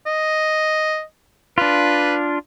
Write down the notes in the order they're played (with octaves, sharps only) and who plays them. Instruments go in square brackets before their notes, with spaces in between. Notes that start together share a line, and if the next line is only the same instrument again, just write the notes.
[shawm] D#5
[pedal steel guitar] D4 F4 [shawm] B4